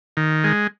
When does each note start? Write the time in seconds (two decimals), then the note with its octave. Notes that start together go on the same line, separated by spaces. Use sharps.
0.17 D#3
0.44 G#3